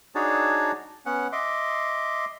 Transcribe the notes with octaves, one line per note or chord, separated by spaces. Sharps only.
D4 D#4 F#4 G#4 C#5 A5
B3 C#4 F#5
D#5 E5 C6 D6